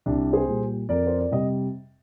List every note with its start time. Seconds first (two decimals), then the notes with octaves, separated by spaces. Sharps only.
0.06 C2 D4
0.33 G#4 C5
0.48 A#2 G3
0.89 F2 A#4 D5
1.07 C5
1.19 D5
1.31 C3 G3 D#5